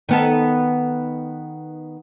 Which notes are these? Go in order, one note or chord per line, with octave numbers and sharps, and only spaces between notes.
D#3 B3 A4